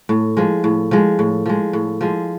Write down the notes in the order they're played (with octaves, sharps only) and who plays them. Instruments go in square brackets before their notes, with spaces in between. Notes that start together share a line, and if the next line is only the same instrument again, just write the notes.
[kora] A2
F3 G#3
A2
F3 G#3
A2
F3 G#3
A2
F3 G#3